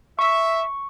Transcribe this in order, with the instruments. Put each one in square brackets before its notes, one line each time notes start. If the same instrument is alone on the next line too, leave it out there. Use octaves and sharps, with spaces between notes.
[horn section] E5 [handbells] C#6